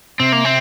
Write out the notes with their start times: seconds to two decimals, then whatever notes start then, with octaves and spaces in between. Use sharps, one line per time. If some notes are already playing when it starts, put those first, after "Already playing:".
0.20 C3 C4
0.32 A#3
0.45 C4